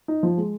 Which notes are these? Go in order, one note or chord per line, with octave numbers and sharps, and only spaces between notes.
D#4
F3
G#3